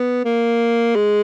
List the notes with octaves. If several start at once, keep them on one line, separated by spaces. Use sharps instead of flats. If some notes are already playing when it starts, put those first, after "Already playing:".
Already playing: B3
A#3
G#3